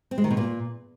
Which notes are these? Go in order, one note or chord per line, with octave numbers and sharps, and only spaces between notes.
C4
G#3
D#3
B2
A#2